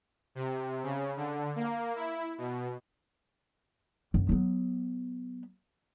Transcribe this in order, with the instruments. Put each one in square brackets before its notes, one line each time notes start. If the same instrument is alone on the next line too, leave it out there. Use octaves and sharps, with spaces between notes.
[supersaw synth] C3
C#3
D3
A#3
E4
B2
[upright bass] F#2
F#3 B3